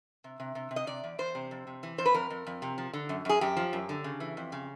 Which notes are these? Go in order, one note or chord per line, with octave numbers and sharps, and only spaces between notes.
C3
C3
C3
C3
D#5
C3 D5
E2
E2 C5
C3
F2
C3
E3
F2 C5
B4
F2 A#4
F2
F2
C3
F3
D3
F#2
F#2 G#4
F#2 G4
F3
F#2
D3
C#3
E3
F2
C#3